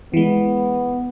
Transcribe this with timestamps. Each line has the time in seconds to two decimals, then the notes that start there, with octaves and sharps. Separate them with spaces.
0.14 E3 G#3 B3